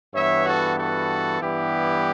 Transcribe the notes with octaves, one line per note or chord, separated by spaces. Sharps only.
G2 E3 B3 C#5 E5
F#4 A4
F#4 A4
G2 E3 G3 B3 E4 G4